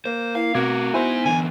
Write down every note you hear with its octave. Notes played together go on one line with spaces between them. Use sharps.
A#3 C5
E4 F5
B2 A3 C4 F#4 A#4 D6 G#6
B3 D#4 E4 C5 G#5
D3 E3 G#5